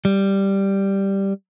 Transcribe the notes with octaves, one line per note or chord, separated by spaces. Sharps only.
G3